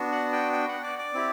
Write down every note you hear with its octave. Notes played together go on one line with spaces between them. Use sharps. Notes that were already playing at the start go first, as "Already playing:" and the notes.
Already playing: B3 D4 F#4
F#5
G5
G5
F#5
D5
D5
C4 E4 G4